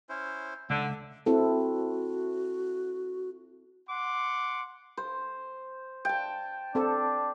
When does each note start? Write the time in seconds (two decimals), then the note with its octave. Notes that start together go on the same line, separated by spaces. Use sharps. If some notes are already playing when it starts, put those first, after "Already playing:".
0.09 C#4 E4 C5
0.70 C#2 D3 E5
1.26 C4 E4 F#4 A4
3.89 F#5 C6 D6
4.97 C5
6.05 G5 A5
6.75 C4 D4 A4